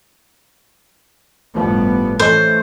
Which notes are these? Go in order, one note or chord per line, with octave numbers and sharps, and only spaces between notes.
G1 A2 F3 G3 B3
E3 A3 C#4 A4 C5 D#5